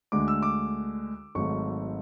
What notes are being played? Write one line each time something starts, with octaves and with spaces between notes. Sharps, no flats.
D2 D3 G#3 D6
E6
D6
G#1 G#2 F#3 A3 C#6